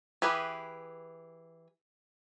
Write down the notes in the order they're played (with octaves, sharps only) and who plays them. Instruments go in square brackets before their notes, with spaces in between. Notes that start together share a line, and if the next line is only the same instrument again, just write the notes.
[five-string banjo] E3 G4 G#4 B4